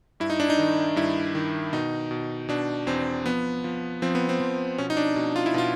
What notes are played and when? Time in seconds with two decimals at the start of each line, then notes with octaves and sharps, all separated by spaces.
0.20 G2 E4
0.30 D#4
0.40 D4
0.50 D#4
0.59 D#3
0.96 G2 E4
1.35 D#3
1.73 B2 D#4
2.11 B2
2.49 B2 D4
2.87 E2 C4
3.26 F3 B3
3.64 F3
4.02 F3 C4
4.15 B3
4.29 C4
4.40 F3
4.78 B2 C#4
4.90 D#4
4.97 D4
5.16 B2
5.36 F4
5.46 E4
5.54 B2 F4